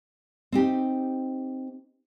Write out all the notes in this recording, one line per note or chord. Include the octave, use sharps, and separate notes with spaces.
C4 D#4 G4